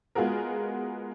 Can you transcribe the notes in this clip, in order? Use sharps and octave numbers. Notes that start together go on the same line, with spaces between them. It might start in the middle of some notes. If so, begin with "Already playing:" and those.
G#3 B3 F4 F#4 G#4 A#4